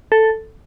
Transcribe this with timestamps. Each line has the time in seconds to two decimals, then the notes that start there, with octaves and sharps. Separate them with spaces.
0.12 A4